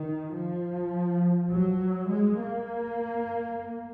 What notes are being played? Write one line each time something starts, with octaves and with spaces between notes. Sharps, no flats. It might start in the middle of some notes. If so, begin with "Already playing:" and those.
Already playing: D#3
F3
F#3
G#3
A#3